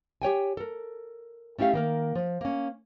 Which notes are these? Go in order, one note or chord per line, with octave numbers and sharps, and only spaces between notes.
G4 C#5 G5 G#5
A4 A#4
A3 C#4 E4 G4 F5
D#3 A#3 A#4
F3
A#3 C#4